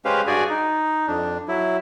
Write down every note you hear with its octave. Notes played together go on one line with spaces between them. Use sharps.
G#3 C#4 G4 B4 C5 F5
G2 F#4 G#4 D5 G#5
D#4
F2 D4
F#3 E4